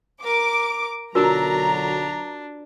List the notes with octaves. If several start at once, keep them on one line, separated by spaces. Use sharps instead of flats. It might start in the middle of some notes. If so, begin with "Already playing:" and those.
A#4 D6
B1 D3 F#3 D4 F4 F#4 A#4 A#5